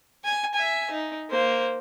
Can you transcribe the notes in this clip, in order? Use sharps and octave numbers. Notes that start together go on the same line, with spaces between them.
G#5
E5 G#5
D#4
A#3 C5